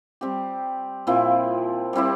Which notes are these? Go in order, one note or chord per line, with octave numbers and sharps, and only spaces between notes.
G3 C4 G4
A#2 F3 C4 E4
G3 C4 E4 G4